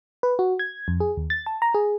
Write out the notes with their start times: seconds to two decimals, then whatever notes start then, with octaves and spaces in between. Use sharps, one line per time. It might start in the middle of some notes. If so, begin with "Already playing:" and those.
0.23 B4
0.39 F#4
0.59 G#6
0.88 F2
1.00 G#4
1.17 D#2
1.30 A6
1.46 A5
1.62 A#5
1.74 G#4